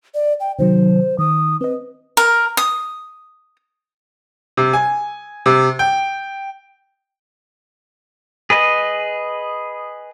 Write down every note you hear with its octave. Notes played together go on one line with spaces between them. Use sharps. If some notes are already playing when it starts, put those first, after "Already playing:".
D5
G5
C3 D#3 F#3 C5
D#3 D#6
C4 B4 D#5
A#4
D#6
C3
G#5
C3
G5
G#4 B4 D#5